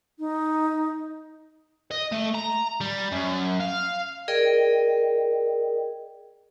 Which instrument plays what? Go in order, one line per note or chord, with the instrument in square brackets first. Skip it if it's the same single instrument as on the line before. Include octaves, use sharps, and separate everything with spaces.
[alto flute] D#4
[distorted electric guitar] D#5
A3
A#5
G3
F#2
F5
[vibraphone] G#4 A#4 D5 D#5 G5